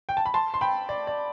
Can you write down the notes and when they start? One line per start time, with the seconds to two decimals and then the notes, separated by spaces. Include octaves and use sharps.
0.09 G5
0.17 A5
0.26 B5
0.34 A5 C6
0.54 C6
0.61 G5 B5
0.89 D5
1.07 D5